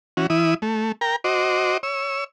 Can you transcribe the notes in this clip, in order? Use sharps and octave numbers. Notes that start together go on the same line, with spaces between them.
E3 C#4 F#4
E3 E4 D#6
A3
A#4 G5 A#5
F#4 C5 D#5 D6
C#5 E6